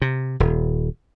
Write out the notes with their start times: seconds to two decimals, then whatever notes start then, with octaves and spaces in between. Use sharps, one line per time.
0.02 C3
0.40 D#1